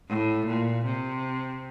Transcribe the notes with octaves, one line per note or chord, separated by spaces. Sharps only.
A2
A#2
C3